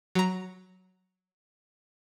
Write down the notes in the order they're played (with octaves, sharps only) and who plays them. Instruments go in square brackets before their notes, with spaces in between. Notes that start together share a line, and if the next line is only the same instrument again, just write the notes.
[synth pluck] F#3 A#5